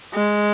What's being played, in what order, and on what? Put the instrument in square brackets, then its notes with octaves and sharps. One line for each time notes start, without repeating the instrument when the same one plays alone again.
[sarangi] G#3